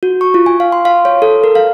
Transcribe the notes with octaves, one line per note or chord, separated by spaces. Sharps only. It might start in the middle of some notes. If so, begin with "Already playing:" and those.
F#4
C#6
F4
G#5
F5
C6
F5
C#5
A4
A#4
F5